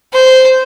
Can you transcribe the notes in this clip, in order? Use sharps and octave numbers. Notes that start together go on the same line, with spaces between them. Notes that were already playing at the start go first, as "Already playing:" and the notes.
C5